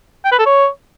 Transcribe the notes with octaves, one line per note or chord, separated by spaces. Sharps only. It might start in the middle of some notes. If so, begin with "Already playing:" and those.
G5
B4
A4
C#5